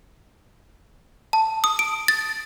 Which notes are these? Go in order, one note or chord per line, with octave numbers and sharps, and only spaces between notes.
A5
D#6
D7
A6